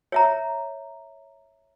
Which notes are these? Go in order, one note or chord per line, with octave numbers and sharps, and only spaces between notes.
C#5 E5 A#5